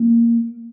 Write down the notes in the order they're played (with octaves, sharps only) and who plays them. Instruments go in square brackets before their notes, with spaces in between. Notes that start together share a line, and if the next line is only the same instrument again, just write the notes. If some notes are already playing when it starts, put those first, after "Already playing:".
Already playing: [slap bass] A#3